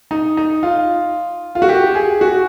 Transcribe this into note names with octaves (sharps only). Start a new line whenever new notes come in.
D#4
D#4
F4
F4
F#4
G4
G#4
F#4